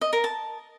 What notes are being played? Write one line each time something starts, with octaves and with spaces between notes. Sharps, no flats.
D#5
A#4
A5